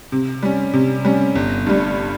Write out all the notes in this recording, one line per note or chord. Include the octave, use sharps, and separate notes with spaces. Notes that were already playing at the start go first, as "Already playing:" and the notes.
C3
G3 C#4
C3
G3 C#4
G1
G2 G3